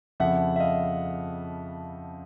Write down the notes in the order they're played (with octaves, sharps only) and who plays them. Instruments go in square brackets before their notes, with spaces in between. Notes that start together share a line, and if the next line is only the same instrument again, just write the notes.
[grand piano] F2 C#3 F3 E5 F#5
E5
D#5 F5